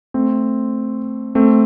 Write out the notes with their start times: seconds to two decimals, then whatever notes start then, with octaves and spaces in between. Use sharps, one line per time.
0.14 A3 C4
1.35 A3 C4